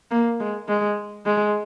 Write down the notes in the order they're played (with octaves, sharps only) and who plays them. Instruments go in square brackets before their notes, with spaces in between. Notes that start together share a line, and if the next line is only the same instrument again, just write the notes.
[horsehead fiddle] A#3
G#3
G#3
G#3